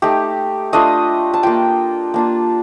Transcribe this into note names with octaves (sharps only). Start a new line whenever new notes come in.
A3 D#4 G4
A3 D4 F4 D#5
A5
A#3 F4 G5
A#3 D4 F4